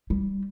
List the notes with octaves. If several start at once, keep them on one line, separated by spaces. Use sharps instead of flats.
G3